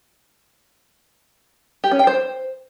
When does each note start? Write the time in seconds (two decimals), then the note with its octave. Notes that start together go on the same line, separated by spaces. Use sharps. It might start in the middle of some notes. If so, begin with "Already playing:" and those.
1.84 G4
1.91 C#4
1.99 G5
2.07 C5